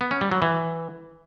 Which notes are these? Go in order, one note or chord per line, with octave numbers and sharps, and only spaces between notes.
B3
C#4
G3
F#3
E3